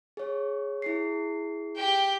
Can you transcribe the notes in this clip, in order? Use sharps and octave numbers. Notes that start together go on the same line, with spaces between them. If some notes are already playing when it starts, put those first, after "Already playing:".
G#4 C#5
E4 G#4 C7
G4 G5